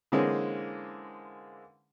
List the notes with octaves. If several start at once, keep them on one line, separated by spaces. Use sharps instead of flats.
D3 E3 G#3 A#3 C4 C#4